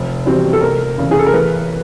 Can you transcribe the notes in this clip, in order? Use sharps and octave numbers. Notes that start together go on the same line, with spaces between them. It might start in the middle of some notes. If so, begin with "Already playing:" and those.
Already playing: F1
E2 B2 G3 C4
A4
F1 A#4
E2 C#3
G#4
A4
A#4
A1 B4